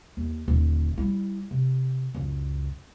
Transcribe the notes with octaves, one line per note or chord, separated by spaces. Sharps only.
D#2
D#1 D3
G3 E4
C3
C#2 F#2